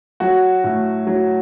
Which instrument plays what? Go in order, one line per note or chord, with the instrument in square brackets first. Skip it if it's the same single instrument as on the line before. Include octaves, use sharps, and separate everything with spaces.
[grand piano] F#3 F#4
A2
F#3